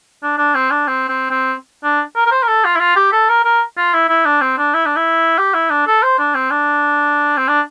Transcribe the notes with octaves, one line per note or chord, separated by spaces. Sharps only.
D4
D4
C4
D4
C4
C4
C4
D4
A#4
A#4
C5
A#4
A4
F4
E4
F4
G4
A4
A#4
A#4
F4
E4
E4
D4
C4
D4
E4
D4
E4
G4
E4
D4
A4
C5
D4
C4
D4
C4
D4